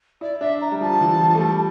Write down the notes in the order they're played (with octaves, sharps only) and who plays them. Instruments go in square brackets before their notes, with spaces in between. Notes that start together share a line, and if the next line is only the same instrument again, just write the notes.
[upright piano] E4 [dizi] D5
[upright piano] D4 [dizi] E5
[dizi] A#5
[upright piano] G3
[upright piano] F3 [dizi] A5
[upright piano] E3
F3
A3
G3